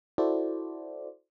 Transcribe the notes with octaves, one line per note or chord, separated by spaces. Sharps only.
E4 F#4 A4 C5 D5